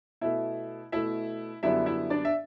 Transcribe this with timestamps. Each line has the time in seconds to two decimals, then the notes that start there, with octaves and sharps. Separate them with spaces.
0.21 B2 A3 E4 E5
0.92 B2 A3 E4 E5
1.63 F#2 D3 G3 B3 E4 E5
1.86 E4 E5
2.10 D4 D5
2.25 E5